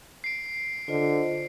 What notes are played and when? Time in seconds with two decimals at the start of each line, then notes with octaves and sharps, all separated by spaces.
0.24 C7 D7
0.88 D3 F4 C5 D#5